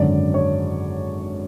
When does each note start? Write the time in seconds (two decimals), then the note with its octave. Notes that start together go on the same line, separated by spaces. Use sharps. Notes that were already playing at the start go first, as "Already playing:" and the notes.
Already playing: G#1 F#2 D3 D5
0.34 C#5